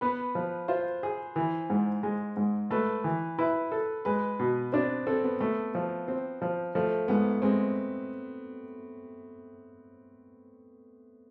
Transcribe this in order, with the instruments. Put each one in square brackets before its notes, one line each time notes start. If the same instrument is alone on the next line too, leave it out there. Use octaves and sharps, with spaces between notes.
[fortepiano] B3 [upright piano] B4
[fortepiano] F3
[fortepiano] F4 [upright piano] C5
[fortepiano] G#4
E3
G#2
G#3
G#2
[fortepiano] A3 [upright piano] B4
[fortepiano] E3
[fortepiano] E4 [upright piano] B4
[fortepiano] A4
[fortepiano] G#3 [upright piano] B4
[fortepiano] B2
[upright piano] C4 [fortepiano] D4
[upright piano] C4 [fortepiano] A4
[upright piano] B3
[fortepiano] A3
F3
C4
F3
[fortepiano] F3 [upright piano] A3
[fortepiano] G#2 [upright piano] B3
[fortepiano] G#3 [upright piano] C4